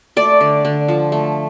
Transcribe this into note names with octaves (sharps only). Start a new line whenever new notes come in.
A3 D5
D3
D3
F3
A3